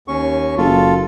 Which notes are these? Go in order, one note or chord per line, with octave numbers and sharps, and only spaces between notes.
D#2 C#4 C#6
F#1 F4 A4